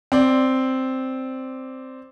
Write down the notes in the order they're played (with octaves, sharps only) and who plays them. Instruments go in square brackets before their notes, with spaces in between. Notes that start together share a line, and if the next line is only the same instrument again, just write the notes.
[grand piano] C4 D5